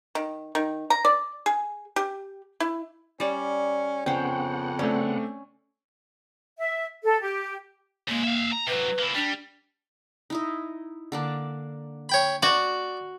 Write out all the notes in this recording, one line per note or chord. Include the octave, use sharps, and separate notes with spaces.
D#3
D#3
A#5
D5
G#4
G4
E4
G3 C#4 D5
F2 C#3 B3 C#4 C5 F#5 G5
A3 C4 C#4 D5
E5
A4
G4
C#3 G#3 A#3
E5 F5
A#5
C3 F#3 B4
A#3 E4
G3 D4
D#4 E4 D#5
D3 A#3 D4
C#5 G5 B5
F#4 D5 C#6